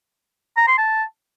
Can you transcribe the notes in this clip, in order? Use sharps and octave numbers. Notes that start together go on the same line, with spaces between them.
A#5
C6
A5